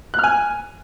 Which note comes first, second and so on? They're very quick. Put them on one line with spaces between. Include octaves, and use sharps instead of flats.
F#6 F6 G#5